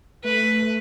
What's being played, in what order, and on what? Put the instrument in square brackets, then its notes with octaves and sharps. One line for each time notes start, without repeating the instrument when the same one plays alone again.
[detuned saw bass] A3 [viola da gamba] B4